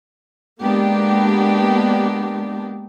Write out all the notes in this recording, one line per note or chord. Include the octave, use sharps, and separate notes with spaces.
G#3 A#3 B3 D4 G4